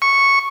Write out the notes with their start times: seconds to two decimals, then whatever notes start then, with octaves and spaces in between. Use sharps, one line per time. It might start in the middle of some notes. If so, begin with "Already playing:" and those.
0.02 C#6